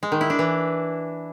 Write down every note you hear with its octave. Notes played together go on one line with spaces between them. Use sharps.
G#3
D#3
E4
D4
E3